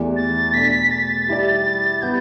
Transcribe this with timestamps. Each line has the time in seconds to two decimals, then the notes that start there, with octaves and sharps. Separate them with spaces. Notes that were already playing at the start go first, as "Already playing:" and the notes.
Already playing: E2 E3 A3 G4 D5
0.16 A6
0.53 B2 A3 D4 B6
0.91 A6
1.28 G3 E4 G4 D5
2.02 G3 B3 G6